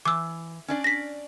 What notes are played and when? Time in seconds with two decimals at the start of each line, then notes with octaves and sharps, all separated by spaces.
0.05 E3 D6 E6
0.68 C#4 D4 D5
0.84 A#6 B6